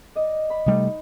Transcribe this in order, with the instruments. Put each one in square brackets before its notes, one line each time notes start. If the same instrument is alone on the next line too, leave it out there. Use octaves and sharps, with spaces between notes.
[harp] D5 D#5
B5
[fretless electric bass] C3 G3 A3 [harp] D#4